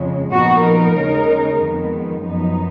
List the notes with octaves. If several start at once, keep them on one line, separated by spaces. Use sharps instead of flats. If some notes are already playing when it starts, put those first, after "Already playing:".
Already playing: F2 C#3 G#3
A#2 F3 B3 D#4 F#4
A#4
D#2 C#3 G#3 D#4
F2 D#3 G#3 B3
F#2 F3 B3 D#4